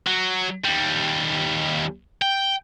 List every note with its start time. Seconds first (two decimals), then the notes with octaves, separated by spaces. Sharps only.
0.07 F#3
0.65 D#2 G3
2.22 G5